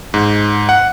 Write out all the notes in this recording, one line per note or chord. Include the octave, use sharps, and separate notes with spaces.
G#2
F#5